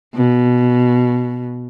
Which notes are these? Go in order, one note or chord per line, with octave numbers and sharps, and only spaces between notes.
B2